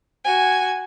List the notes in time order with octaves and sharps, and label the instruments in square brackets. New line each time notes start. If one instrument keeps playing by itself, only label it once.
[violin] F#4 G#5